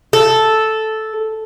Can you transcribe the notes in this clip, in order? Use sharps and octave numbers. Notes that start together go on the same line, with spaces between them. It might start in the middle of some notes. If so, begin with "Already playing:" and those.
A4